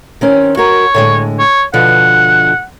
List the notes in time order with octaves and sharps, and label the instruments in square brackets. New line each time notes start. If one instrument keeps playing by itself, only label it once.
[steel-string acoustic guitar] D#3 C4 C#4
[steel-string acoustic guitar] F#4 A#4 [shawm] C#5
[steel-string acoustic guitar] A2 D3 G#3
[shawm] C#5
[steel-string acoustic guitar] B2 D3 F3 [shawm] F#5